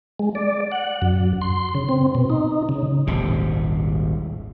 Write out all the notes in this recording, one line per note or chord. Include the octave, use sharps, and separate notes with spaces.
G#3
D5
F#5
F#2
C6
C#3
C4
B2
D#4
C#3
D#1 G#1 C3